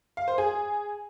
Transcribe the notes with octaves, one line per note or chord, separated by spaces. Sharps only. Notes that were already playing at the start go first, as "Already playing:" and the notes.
F5
C5
G#4